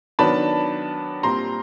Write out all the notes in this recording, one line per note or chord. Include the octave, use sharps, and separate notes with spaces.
D#3 F#3 B3 D4 A5 B5
A#2 G3 C4 A#5 C6